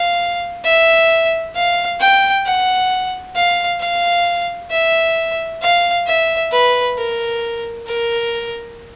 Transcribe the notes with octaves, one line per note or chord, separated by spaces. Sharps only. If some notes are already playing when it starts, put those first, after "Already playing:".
Already playing: F5
E5
F5
G5
F#5
F5
F5
E5
F5
E5
B4
A#4
A#4